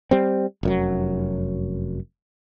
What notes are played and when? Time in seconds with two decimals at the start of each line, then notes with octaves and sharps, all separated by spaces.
0.11 G3 C4
0.63 F1 F#2 F#3